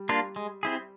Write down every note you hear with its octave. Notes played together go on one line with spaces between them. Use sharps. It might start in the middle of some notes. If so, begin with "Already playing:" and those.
Already playing: G3
A#3 D4 F4
G#3
C4 E4 G#4